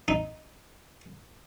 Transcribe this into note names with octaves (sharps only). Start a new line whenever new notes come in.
D#4